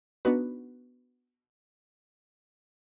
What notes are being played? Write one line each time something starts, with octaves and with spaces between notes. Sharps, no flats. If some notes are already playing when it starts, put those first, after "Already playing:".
B3 D4 D#4 F#4 B4